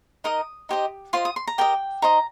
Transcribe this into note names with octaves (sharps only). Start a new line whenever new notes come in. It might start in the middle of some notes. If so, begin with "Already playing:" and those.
D#4 A#4 D#5 D#6
D#4 G4 C5 D#5
F4 C5 D#5 C6
D#6
C6
A#5
G4 A#4 D#5 G5
D#4 C5 D#5 A#5